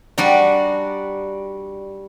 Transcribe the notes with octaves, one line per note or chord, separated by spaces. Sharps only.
G3 D4 F#4 A#5